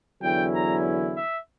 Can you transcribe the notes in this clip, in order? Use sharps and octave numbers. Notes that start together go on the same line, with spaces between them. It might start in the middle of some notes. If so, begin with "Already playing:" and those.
E2 D3 F#3 C#4 E4 G5
A#5
E5